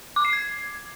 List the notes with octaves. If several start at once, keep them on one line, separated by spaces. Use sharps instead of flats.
D6
C7
G#6